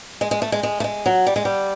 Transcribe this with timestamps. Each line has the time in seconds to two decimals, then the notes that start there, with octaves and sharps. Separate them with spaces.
0.21 G#3
0.31 G#3
0.42 A3
0.52 G#3
0.63 G#3
0.80 A3
0.84 G#3
1.06 F#3
1.27 G3
1.36 G#3
1.45 G3